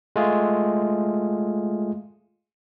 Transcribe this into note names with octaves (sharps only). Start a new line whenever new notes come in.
G#3 A3 F4 G#4